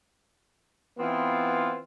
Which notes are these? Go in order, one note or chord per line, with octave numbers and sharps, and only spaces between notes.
E3 B3 C4 F4